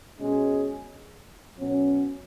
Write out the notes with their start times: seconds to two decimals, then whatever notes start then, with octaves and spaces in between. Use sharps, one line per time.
0.18 B2 G#3 C#4 G#4
1.55 B2 F#3 C#4